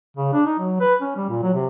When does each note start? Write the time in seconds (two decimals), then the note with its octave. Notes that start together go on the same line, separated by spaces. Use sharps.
0.17 C#3
0.33 D4
0.46 D#4
0.59 F#3
0.80 B4
1.01 C#4
1.16 G3
1.29 A#2
1.43 F#3
1.54 C3